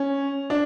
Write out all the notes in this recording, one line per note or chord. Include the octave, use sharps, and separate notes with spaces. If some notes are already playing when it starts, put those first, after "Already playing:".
Already playing: C#4
D4